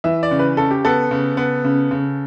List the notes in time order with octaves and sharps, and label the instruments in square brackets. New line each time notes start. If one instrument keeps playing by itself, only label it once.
[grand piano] E3 E5
D5
C#3
B4
C#3 A4
G4
B3 A4
C#3
B3
C#3
C#3